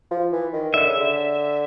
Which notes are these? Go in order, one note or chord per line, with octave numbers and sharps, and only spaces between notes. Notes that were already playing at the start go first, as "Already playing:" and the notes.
F3
E3
D#3
D3 E5
C#3
D3